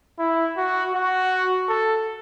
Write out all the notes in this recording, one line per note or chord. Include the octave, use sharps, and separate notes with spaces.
E4
F#4
F#4
A4